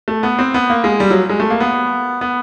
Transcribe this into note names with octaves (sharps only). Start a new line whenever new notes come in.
A3
B3
C4
B3
A#3
G#3
G3
F#3
G#3
A3
A#3
B3
B3